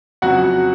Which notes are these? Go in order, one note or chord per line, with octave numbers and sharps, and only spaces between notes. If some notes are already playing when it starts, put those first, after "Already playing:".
F2 C#3 F#3 F#4 F#5